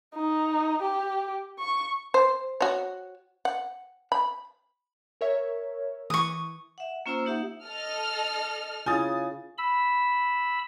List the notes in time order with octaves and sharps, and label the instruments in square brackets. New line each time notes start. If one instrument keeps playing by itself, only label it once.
[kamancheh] D#4
G4
C#6
[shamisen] C5
F#4 C#5
F#5
B5
[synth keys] A#4 C#5 E5
[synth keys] E3 [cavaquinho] C#6 D#6
[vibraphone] E5 F#5
A#3 C#4 F4 C5 A#5 E6
A#3 D#4 G4 E5 F#5
[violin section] A4 D#5 F6
[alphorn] C#3 [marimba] E4 F4 [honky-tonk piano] G#5 D#6 A6
[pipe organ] B5 E6